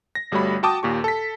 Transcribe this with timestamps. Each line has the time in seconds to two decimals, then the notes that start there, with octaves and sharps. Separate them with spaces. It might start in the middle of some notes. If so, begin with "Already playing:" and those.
0.15 A#6
0.32 G1 G3 A3 F#4 C#5 B5
0.63 F#4 G5 A5 D6 D#6
0.83 D#2 A#2 G4 C#6
1.04 A4 B6